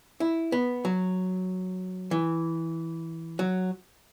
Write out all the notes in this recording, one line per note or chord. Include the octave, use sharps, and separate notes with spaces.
E4
B3
F#3
E3
F#3